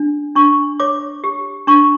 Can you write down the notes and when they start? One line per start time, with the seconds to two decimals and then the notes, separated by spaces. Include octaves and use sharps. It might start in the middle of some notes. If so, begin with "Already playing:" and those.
Already playing: D4
0.36 D4 C#6
0.80 C#5 D6
1.24 G4
1.67 D4 C#6